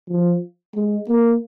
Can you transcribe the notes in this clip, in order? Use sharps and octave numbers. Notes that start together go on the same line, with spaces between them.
F3
G#3
A#3